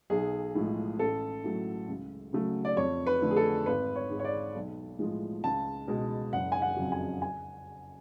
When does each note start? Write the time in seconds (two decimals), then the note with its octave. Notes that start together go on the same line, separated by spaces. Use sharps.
0.10 B1 G#4
0.55 A2 F3 G#3
0.99 A1 A4
1.44 A2 F#3 A3
1.89 C#2
2.33 C#3 F#3 A3
2.65 D5
2.77 F2 C#5
3.07 B4
3.22 D3 F3 A3
3.31 G#4
3.36 A4
3.66 G#1 B4
3.96 C#5
4.10 G#2 G#3
4.19 C#5
4.25 D5
4.55 B1
4.99 A2 F3 G#3
5.44 C#2 A5
5.88 B2 G#3
6.33 F#1 F#5
6.52 G#5
6.62 F#5
6.77 F2 C#3 F#3
6.92 G#5
7.22 G#5